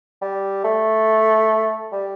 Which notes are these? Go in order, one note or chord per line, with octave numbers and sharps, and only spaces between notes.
G3
A3
G3